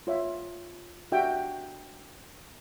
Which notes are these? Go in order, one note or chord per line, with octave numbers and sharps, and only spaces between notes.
F4 C#5 E5
D4 F#4 G4 E5 G5